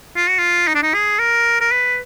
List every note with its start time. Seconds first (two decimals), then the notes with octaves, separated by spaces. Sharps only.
0.16 F4
0.28 F#4
0.39 F4
0.68 D#4
0.75 D4
0.83 D#4
0.94 G#4
1.19 A#4
1.61 A#4
1.71 B4